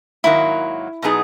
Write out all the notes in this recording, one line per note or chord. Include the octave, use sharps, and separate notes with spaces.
G#2 D#3 F#3 A#3 E4
B2 F#3 B3 D#4 G#4